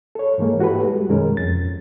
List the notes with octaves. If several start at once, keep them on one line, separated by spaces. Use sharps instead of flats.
A4 C#5
G#2 E3 G#3 A#3
E4 F#4 G4 A4 B4
G3 G#3
F#2 B2 D#3 G#3 C#4 A#4
F2 A6